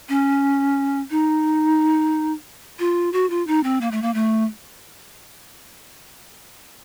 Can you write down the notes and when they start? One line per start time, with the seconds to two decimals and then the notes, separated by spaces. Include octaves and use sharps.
0.09 C#4
1.10 D#4
2.79 F4
3.13 F#4
3.30 F4
3.47 D#4
3.63 C4
3.81 A#3
3.91 A3
4.02 A#3
4.14 A3